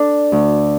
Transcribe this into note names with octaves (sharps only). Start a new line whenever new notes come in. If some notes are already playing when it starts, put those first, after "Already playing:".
Already playing: D4 A4
D2